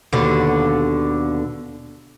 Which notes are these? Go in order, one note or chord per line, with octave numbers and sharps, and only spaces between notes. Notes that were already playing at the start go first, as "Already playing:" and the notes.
D#2 B2 D3